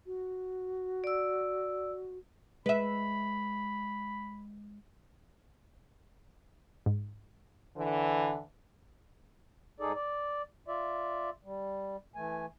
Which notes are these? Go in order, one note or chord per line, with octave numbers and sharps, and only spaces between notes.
F#4
D5 E6
G#3 B4 E5 B5
G#2
D3 E3
G#2 D#4 G#4 A4 D5
D5
F4 D5 E5
G3
E3 A3 G#5